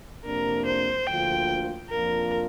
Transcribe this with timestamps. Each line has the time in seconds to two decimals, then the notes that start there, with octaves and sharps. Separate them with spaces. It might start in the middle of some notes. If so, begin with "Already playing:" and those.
0.25 F2 C3 A#3 D4 A#4
0.66 C5
1.07 D2 D3 F3 A#3 F4 G5
1.90 F2 F3 A#3 D4 F4 A#4